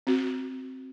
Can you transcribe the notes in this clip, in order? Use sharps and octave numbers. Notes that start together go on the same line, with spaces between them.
C4 F#4